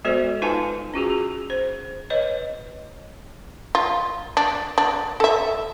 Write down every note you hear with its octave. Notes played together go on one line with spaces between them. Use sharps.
G#3 B3 F#4 A4 C5 D5
D#4 F4 B4 F5 G#5 A5
C#4 F4 F#4 G#4
G#4
C5
B4 C#5 D#5
F4
D4
D4
A4 E5